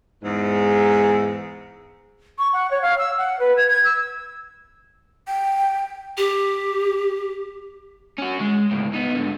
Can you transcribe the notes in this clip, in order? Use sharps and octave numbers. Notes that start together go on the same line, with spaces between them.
E2 G#2
C#6
F#5
C#5
F5
E6
F#5
B4
G#6
G#6
E6
G5
G4
C#4 F#4
G#3
C#2 A2
B3 D#4
G#2 D3